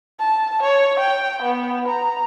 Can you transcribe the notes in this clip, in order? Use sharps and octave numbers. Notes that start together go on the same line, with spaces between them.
A5
C#5
G5
B3
A#5